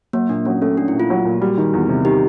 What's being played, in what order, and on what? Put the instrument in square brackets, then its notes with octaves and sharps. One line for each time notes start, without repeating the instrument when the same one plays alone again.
[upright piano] F#3 [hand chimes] A#3
[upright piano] A#2 [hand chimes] D4
[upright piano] F#3 [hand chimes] C#4
[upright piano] A3 [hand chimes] C#4
[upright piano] A3 [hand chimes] D4
[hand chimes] E4
[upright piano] A#2
[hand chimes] F4
[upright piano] F#3
A#2
[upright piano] G3 [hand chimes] F#4
[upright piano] D#3
E2
C3
[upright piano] D#3 [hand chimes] G4